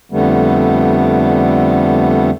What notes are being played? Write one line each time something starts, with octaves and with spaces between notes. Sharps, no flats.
F2 D3 G3 A3 B3